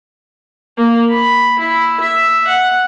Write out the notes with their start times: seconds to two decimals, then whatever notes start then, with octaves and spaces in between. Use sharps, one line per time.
0.77 A#3
1.09 B5
1.59 E4
2.00 E5
2.47 F#5